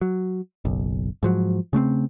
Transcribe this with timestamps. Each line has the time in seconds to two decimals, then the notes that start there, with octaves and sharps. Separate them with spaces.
0.01 F#3
0.65 F#1 B1
1.23 G#2 F3 F#3
1.73 C#3 A3 B3 C4